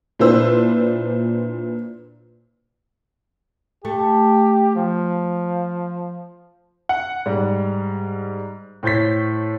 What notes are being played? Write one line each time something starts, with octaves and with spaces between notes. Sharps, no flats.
A#2 D4 E4 B4 C5 E6
A3 G4
F3
F#5
G#2 G3
A2 C5 C#5 G6 A6 B6